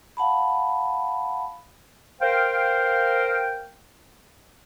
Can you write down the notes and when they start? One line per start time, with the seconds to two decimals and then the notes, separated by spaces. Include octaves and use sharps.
0.17 F5 F#5 A5 B5
2.21 A#4 C5 F5 G5